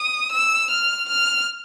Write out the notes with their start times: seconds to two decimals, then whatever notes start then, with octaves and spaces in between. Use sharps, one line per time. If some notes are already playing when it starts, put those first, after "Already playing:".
Already playing: D#6
0.32 E6
0.71 F6
1.09 F6